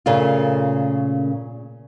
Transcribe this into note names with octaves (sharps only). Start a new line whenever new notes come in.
A#2 C#3 A3 F4